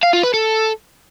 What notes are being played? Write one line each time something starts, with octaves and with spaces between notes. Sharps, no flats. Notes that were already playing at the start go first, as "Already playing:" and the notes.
F5
F4
B4
A4